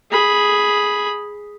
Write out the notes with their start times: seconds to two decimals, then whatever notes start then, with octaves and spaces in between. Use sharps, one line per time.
0.12 G#4 B5